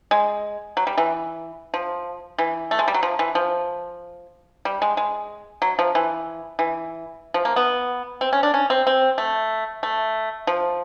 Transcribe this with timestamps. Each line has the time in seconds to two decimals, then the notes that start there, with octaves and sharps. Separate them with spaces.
0.11 G#3
0.77 F#3
0.87 G3
0.98 E3
1.74 F3
2.38 E3
2.71 A3
2.79 G#3
2.88 G3
2.94 F#3
3.03 F3
3.19 E3
3.35 F3
4.65 G3
4.82 G#3
4.97 G#3
5.62 F#3
5.79 F3
5.95 E3
6.59 E3
7.34 F3
7.45 A#3
7.56 B3
8.21 C4
8.33 C#4
8.43 D4
8.54 C#4
8.70 C4
8.87 C4
9.18 A3
9.83 A3
10.47 F3